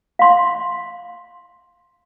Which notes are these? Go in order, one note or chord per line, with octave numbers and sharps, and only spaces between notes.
F5 C6